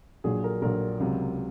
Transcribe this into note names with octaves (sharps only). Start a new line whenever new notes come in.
A#1 A#2 F#3 G#4
A#4
A#1 A#2 F#3 A#4
C#2 C3 F#3